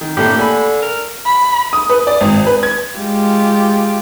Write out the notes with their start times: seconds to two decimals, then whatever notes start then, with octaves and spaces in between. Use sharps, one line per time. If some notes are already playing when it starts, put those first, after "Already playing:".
0.01 D#3
0.17 A2 D3 A#3 G4
0.38 D3 G#5 B5
0.82 A#4
1.26 B5
1.73 D#6
1.90 B4
2.07 D5
2.21 G#1
2.47 B4
2.63 G#6
2.98 G#3 F4 G4